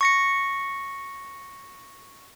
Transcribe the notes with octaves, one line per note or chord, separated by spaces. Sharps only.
C#6 A#6 C#7